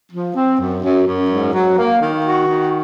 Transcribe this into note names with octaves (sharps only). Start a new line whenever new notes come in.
F3
C4
F#2
F#2
F#2
G#2
F#3
A#3
D#3
F#4
D#3